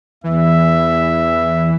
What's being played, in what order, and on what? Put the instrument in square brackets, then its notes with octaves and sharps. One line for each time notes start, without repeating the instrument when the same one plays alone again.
[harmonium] E2 [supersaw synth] E3 [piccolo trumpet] E5